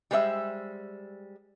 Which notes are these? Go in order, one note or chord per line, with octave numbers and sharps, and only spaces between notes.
G3 G#3 C5 C#5 E5